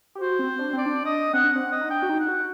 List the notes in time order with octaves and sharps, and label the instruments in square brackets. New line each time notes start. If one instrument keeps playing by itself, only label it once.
[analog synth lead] G4
[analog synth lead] F#4 [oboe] C5
[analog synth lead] C4
D4
[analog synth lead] C4 [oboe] D5
[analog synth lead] D4
[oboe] D#5
[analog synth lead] C4 [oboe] F#5
[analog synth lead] D4
[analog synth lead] C4 [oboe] F#5
[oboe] D#5
[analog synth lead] D#4
[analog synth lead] D4 [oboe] G5
[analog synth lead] F#4
D#4
[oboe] F#5
[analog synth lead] F#4